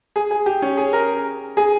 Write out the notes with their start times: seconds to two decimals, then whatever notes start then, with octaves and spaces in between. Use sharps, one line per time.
0.16 G#4
0.31 G#4
0.46 G4
0.62 C#4
0.77 G#4
0.93 A#4
1.57 G#4